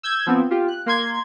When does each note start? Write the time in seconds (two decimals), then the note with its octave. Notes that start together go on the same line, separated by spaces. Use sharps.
0.03 E6 G6 G#6
0.26 F3 B3 C4
0.51 F4 G4
0.68 F#6
0.86 A#3 C6 G#6